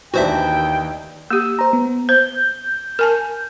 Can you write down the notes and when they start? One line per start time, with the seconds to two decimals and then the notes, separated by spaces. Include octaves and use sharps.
0.14 D#2 E3 D4 F#4 C5 E5 G5
1.30 A#3 G4 E6
1.59 C5 A#5
1.73 B3
2.09 C5 G6
2.99 A#4 G#5 A5